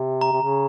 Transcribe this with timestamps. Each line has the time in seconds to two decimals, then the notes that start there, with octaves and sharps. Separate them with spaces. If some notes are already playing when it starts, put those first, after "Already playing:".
Already playing: C3
0.21 A#5
0.32 C3
0.42 C#3